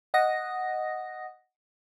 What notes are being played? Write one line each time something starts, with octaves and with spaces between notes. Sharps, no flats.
D#5 F#5 D#6 A#6